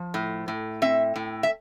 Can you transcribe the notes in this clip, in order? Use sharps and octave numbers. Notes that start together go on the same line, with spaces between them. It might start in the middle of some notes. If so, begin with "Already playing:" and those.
Already playing: F3
A2
A2
C4 E5
A2
E5